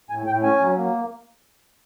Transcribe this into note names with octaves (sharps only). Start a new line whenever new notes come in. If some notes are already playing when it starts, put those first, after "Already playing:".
A2 G#5
A2 G5
C#4 G#5
F#3
A#3